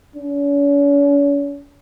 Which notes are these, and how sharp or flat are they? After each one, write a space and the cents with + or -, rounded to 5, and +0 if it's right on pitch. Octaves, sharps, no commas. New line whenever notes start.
C#4 +40